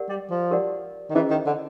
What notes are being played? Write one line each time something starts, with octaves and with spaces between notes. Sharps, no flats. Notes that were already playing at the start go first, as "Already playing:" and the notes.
Already playing: G4 A#4 D5 F#5
G3
F3
G4 A#4 D5 F#5
D#3
E3 C#4 E4 G#4 C5 D#5
D#3
D3